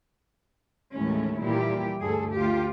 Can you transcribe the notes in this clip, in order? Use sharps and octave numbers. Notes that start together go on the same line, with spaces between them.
D#2 A2 E3 G#3 A3 C#4
A#2 E3 G3 E4 G4
D2 G2 G#4 A4
D2 A3 F4 G4